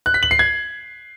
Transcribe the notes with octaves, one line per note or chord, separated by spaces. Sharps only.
F#6
B6
F#7
C7
G#6